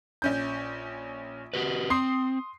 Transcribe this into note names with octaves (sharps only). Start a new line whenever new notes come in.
A#1 C#4 G6
F#4 G4 B4
C4 C6 D#6 C7